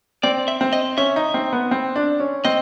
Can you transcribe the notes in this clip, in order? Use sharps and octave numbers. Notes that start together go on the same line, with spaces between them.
C4 D5
E5
C4
D#5
C#4 E5
D#4
C4
B3
C4
D4
C#4
C4 D#5